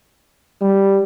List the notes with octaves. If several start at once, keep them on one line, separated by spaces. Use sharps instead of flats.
G3